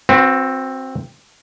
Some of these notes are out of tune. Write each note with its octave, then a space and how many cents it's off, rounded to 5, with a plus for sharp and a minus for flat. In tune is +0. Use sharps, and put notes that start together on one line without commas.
C4 +10 F#4 -25 B4 +30